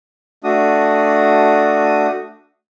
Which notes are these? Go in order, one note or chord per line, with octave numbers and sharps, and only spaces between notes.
A3 D4 F#4 D#6